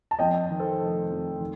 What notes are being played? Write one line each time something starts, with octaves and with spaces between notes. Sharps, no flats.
A5
F2 D#5 G5
D#3
A4 C5
F1
F2
D#3